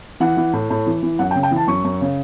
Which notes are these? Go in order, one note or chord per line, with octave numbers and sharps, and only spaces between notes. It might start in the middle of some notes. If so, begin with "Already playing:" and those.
E3 F#5
E3
A2
A2
E3
E3
F#2 F#5
G5
C#3
G5
E3
A5
F#2 C#6
F#2
C#3